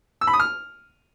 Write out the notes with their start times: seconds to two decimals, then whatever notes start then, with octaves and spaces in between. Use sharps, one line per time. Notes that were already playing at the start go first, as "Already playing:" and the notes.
0.21 E6
0.27 B5
0.33 D#6
0.39 F6